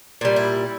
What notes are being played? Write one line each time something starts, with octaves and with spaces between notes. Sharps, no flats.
A#2 G3
E4